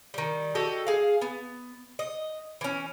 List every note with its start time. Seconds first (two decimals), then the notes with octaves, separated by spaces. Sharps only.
0.14 D#3 G3
0.55 F#4 G4 A4 D#5
0.87 G#4 F5
1.21 B3
1.99 D#5
2.61 E3 C#4